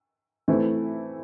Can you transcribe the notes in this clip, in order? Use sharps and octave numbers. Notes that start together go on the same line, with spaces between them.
E3 A3 C4 E4